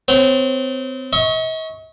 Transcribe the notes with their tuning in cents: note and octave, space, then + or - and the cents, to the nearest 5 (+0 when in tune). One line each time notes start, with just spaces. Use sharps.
C4 -35 C#5 -40
D#5 +45 C#6 +0